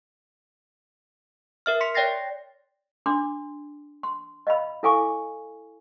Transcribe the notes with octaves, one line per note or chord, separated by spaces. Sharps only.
A#4 E5 F6
C6 B6 C#7
C#5 D5 G5 A6 A#6 C7
D4 C6 D6
C6
D#5 F5 B5
E4 A4 F5 G#5 C#6 D6